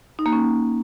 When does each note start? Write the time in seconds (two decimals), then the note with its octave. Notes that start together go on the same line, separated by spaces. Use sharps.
0.19 D#4
0.26 A#3
0.33 C#4